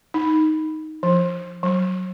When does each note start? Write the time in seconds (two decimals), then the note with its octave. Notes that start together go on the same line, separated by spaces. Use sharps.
0.14 D#4
1.03 F3
1.63 F#3